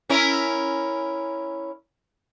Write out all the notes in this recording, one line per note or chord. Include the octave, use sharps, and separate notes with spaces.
C#4 E4 A#4